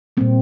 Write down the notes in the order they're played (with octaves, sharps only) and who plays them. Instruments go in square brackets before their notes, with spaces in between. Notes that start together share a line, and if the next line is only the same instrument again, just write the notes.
[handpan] A#2 G3 A#3 C4